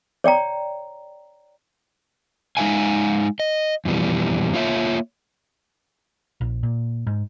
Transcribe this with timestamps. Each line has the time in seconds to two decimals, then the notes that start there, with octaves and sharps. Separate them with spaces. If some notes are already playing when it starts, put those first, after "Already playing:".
0.24 C#5 D5 G5 A#5
2.57 G#3 D#4 F#4 E5 F5 G#5
3.40 D#5
3.85 F2 B2 E3 G3
4.54 A#3 F4 C#5 E5
6.41 A#1
6.63 A#2
7.07 G#2